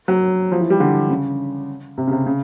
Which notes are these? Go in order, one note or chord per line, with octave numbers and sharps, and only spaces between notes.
F#3
F3
E3
G3
D3
C#3
C3
C#3
C3
C#3